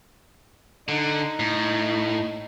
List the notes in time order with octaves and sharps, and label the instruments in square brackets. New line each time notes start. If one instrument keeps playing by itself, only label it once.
[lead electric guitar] D3 [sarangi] D#4
[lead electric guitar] A2